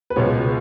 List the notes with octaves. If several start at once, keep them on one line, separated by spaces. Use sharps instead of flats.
B4
C#2 B2 G#3 B3 C#5